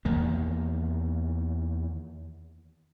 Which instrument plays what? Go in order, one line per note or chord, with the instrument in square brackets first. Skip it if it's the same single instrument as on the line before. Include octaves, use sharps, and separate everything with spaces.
[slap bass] E2 D#3 A#3